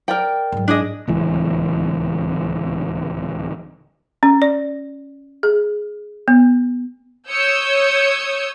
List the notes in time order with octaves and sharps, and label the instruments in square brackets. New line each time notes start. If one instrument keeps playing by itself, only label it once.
[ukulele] A#4 D5 G5
[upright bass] G#2 F#3
[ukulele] D4 G#4 D#5
[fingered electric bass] D1 C#2 E3
[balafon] C#4
D5
G#4
B3
[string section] C#5 D#6 E6 G6 G#6 C#7